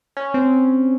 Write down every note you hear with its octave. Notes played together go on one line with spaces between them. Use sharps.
C#4
C4